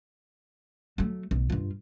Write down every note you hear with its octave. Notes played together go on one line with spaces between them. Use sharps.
F#3 A3
B1
G2 F4